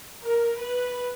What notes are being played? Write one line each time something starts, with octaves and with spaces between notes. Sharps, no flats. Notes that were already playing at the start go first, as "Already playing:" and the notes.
A#4
B4